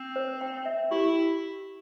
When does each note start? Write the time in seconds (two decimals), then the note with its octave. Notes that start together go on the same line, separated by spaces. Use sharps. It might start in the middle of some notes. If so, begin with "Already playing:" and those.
Already playing: C4
0.16 C5
0.41 G5
0.66 E5
0.91 E4 G4